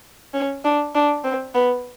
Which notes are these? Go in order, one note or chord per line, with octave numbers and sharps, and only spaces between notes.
C#4
D4
D4
C4
B3